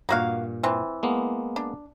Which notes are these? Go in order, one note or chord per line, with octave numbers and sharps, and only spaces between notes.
G2 A#2 A#3 F#4 F5
E3 C4
G#3 A#3 B3
D4